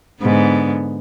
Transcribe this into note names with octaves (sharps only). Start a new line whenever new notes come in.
G#2 D3 B3